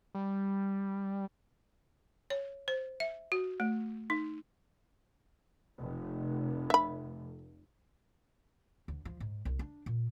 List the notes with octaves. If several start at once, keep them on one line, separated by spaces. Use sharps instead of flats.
G3
C#5
C5
E5
F#4
A3
D#4
F1
E5 B5
D2
F3
G#2
C2
D4
A#2